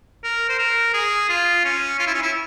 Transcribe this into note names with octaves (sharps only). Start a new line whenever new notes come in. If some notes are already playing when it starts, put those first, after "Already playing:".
A#4
C5
A#4
G#4
F4
C#4
F4
E4
C#4
E4